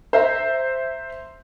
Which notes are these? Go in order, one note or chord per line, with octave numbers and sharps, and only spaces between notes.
C5 E5 A#5